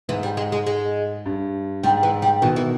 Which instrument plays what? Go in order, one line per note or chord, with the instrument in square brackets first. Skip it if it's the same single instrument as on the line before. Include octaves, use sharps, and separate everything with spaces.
[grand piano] G#2 [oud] E3
[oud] G3
G#3
G#3
G#3
[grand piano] G2
[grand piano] G#2 [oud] G3
[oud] E3
G3
[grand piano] B2 D#3 [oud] E3
[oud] E3